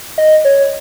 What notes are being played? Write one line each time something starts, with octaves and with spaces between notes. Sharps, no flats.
D#5
C#5